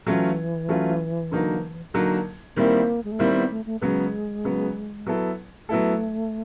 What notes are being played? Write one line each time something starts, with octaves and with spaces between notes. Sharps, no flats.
E3 F#3 A3 C#4 F4
F#3 A3 C#4 F4
D3 F#3 A#3 D#4
D3 F#3 A#3 D#4
D#3 G3 A#3 C4 E4
G#3
A3
D#3 G3 A#3 C4 E4
B3
A3
A3
C#3 F#3 G#3 B3
C#3 F#3 B3
F#3 B3 E4 A4
F#3 A3 B3 E4 A4